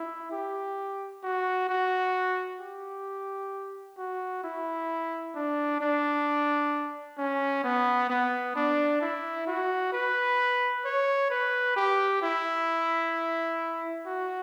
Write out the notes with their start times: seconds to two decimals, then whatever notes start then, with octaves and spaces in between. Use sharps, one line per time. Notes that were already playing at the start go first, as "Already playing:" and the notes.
Already playing: E4
0.32 G4
1.23 F#4
1.69 F#4
2.60 G4
3.98 F#4
4.44 E4
5.35 D4
5.81 D4
7.18 C#4
7.64 B3
8.10 B3
8.56 D4
9.02 E4
9.47 F#4
9.93 B4
10.85 C#5
11.30 B4
11.77 G4
12.22 E4
14.06 F#4